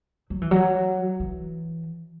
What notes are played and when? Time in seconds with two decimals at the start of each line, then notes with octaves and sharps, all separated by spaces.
0.30 F#3
0.42 E3
0.51 F#3
1.20 E3